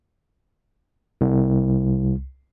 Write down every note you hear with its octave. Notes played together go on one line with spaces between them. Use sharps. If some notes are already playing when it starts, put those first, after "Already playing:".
C2